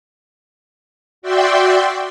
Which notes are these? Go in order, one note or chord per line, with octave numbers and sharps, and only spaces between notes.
F#4 D5 E5 G5 C6